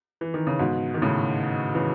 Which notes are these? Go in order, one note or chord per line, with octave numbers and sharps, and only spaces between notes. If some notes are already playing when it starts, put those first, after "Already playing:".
E3
D#3
C#3
G#2 B2
D#3
A2 C#3
C#3 E3